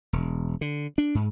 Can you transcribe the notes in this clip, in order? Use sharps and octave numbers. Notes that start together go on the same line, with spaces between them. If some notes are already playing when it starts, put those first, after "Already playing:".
E1
D3
D4
G#2